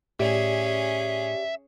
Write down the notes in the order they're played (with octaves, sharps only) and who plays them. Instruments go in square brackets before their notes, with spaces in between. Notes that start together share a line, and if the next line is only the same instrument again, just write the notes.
[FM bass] A2 [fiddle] C#4 G#4 [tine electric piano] G4 D5 [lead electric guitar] E5